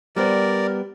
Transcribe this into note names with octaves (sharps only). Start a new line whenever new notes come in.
G3 B3 A#4 C5 D5